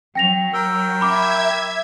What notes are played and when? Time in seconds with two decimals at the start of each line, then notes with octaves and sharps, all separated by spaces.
0.15 F#3 G5 A#6 F7
0.54 A#4 G5 E6
1.01 E5 B5 D6 G#6